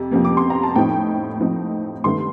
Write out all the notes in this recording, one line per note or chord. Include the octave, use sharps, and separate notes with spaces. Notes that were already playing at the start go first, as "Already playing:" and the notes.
Already playing: F2 C3
F2 C3 F3 A#3
D6
C6
A#5
A5
A2 F3 C4 D#4 G5
A2 F3 C4 D#4
G2 D#3 A3 C6